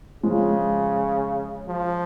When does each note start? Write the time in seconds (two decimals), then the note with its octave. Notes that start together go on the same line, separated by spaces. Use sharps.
0.23 C#3 F3 G#3
1.68 F3